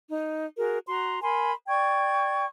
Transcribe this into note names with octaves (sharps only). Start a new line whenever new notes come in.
D#4
F#4 G#4 A#4
F#4 A#5 C6
A#4 G#5 B5 C6
D5 G5 C#6 G#6